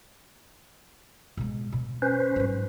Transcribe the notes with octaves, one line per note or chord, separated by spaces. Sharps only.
B2 G#3
B2
C#4 B4 C5
G#2 F#3